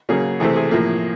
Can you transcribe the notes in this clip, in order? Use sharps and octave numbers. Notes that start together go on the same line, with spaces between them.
C#3 F#3 A#3 C#4 G#4
C3 E3 A3 C4 G#4
G#4
A2 F3 A#3